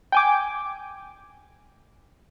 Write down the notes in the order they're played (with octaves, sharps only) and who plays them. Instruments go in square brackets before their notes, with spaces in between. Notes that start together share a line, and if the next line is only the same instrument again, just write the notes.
[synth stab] G5 G#5 D6